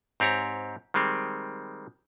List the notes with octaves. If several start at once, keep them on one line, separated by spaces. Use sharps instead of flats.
G#2 C4 G4 C#5 A#5
D#3 G3 G#3 C4